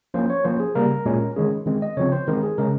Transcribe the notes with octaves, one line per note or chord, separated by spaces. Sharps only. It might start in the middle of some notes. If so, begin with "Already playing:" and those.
F3 A#3 C#4 C5
C#5
F3 A#3 C#4 C5
G#4
C#3 G3 A#3 A#4
A#2 G#3 C#4
D#3 G#3 C#4 G#4
D#3 G#3 C4
D#5
C#3 F3 C4 C#5
C5
D#3 G#3 C4 A#4
G#4
C#3 G#3 C#4 A#4